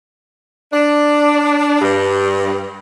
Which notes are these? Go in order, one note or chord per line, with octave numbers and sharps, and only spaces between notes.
D4
G2